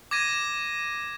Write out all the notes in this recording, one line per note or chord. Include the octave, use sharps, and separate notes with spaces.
D6 G#6 A#6 D#7